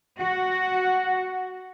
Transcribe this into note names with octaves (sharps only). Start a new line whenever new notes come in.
F#4 F#5